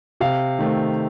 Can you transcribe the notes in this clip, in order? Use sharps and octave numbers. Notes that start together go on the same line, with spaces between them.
C3 F5
D#3 A3 C4